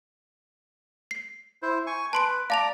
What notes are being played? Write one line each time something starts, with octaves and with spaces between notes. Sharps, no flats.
C7
E4 C5
G#5 C#6
B4 A5 C6 D7
D5 F5 A5 A#5 F7